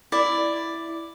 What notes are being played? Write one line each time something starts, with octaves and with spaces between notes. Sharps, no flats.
E4 D5